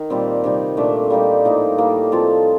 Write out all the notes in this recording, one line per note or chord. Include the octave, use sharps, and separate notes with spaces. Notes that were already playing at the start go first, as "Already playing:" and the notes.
Already playing: D#3
A#2 G3 C4
C3 D#3 G3
A#2 A3 D4
G3 A#3 D#4 G4
A2 F3 A#3 D#4
A2 G3 A#3
F3 C4 F4 A4